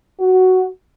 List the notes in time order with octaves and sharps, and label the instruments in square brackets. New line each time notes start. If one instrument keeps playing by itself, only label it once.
[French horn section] F#4